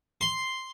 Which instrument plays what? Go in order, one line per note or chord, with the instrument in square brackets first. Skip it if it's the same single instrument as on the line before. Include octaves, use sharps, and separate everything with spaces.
[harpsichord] C6